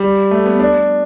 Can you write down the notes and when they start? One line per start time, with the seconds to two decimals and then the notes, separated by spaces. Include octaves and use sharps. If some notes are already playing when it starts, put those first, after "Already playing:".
Already playing: G3
0.31 A3
0.46 B3
0.60 D4